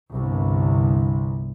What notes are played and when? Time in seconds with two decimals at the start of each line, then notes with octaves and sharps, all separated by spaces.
0.14 G1 C2